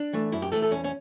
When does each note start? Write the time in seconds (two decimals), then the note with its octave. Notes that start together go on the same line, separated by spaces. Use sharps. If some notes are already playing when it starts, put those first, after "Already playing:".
Already playing: D4
0.13 E3 A3
0.32 F#2 E4
0.42 G4
0.52 E3 A3 A4
0.62 A4
0.71 E2 C#4
0.84 C#4